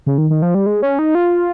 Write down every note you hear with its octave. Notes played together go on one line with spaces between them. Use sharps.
C#3
D#3
D#3
F3
G3
G#3
C#4
D#4
F4